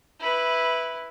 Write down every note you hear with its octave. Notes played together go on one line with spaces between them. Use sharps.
E4 B4